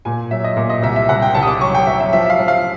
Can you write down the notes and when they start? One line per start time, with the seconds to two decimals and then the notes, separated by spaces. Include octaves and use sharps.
0.05 A#2 G#5
0.31 F#3 E5
0.44 D#5
0.56 A#2 E5
0.70 D#5
0.83 C2 E5
0.96 E5
1.09 C2 F#5
1.22 G5
1.34 C2 A5
1.43 D#6
1.48 D6
1.61 F#3 C#6
1.74 G5
1.87 F#3 E5
2.00 E5
2.13 F3 E5
2.26 E5
2.30 F5
2.39 F3
2.48 F5